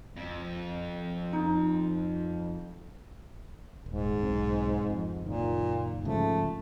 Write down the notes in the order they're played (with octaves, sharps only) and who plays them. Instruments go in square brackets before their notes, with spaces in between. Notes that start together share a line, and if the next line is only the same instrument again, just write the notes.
[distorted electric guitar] F2
[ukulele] D#4
[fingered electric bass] D#1 [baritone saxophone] G#2
[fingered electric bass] B1 C4
F2
[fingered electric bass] F#1 D#3 [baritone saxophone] A#2
[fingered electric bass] G#2 C#3 F3 [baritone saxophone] A3